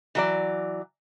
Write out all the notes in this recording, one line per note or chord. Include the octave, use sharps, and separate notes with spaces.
E3 F#3 D5